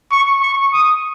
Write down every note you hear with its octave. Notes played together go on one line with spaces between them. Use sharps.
C#6
C#6
D#6